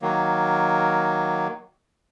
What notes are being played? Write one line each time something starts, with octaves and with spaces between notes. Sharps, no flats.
D#3 F#3 A#3